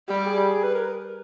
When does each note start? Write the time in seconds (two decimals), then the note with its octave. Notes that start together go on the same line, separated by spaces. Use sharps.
0.09 G3 G4
0.26 G#4
0.64 B4
0.75 A#4